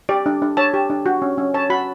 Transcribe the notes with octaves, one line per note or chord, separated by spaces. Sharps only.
G4 D5
D4
D4
C#5 A5
G4
D4
F#4
C#4
C#4
C#5 A5
F#4 B5